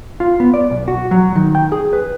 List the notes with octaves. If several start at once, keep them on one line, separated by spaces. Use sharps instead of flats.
F4
B3
D5
B1
F#4
F#3
D#3
G5
G#4
B4